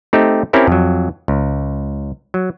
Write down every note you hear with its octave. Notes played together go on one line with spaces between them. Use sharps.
A3 C4 D#4 G4
C4 C#4 E4 G4 A#4
F2 F#3
C#2
F#3